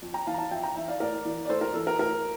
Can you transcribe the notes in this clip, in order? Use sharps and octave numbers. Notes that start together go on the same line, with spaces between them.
F2
G5 A#5
E3 F5 A5
A#5
F5 A5
F2 E5 G5
G5 A#5
E3 E5 G5
D5 F5
A2 A#4 D5
E3
D5
A2 A4 C5
A#4
E3 A4
A#4
A2 A#4